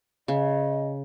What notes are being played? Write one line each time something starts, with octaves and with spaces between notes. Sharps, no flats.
C#3 D#5